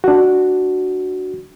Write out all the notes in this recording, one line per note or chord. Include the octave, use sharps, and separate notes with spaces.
D4 F#4